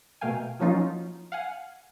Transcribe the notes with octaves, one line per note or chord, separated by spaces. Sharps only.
B2 A3 A#3 F5 G5 G#5
F3 F#3 A#3 C#4 D#4 F4
F5 F#5 G#5